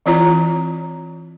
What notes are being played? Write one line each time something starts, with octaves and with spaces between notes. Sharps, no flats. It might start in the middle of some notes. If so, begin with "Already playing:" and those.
E3 C4 E4 F4 C#5 A#5